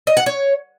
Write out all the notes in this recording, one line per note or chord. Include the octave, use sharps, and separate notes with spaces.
D#5
F#5
C#5